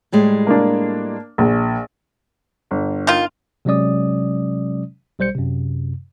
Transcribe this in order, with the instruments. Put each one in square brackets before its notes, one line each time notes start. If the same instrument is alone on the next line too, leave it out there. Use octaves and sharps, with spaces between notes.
[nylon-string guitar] A2 G3 G#3
[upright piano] A#3 D4
A#1
[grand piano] G1
[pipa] D#3 F4
[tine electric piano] C3 F#3 G#3 C#4 D5 D#6
B1 G3 C5 G6 C#7
F#2 C3